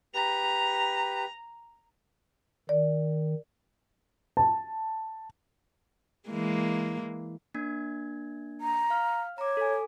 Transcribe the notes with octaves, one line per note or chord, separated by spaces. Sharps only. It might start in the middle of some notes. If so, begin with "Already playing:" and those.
G4 B4 A#5
D#3 D5
A5
E3 G#3 A#3
A#3 D4 G#6
A#5
F5 F6
C#5 A#5 D6
A4 G#5